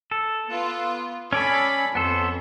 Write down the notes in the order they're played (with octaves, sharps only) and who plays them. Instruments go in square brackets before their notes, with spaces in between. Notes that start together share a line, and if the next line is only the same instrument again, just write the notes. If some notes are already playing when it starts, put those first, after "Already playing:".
[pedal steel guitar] A4
[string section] B3 F4
[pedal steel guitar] C#4 D5 G#5 [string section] A4 B5
[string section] F2 C#4 [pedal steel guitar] B3 A4 C5